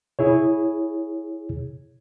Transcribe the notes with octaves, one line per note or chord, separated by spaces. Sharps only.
E4 G#4 C#5